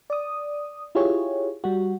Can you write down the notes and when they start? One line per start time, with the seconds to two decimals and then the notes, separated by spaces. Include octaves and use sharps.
0.10 D5 D#6
0.95 E4 F4 G4 G#4 C#5
1.64 G3 F#4